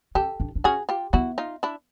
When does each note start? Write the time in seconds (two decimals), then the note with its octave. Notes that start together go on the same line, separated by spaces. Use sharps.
0.15 C#4 G4 A4
0.40 D4
0.55 D4
0.64 C#4 F#4 G#4
0.89 F4 G4
1.13 B3 E4 F#4
1.38 D#4 F4
1.63 D4 E4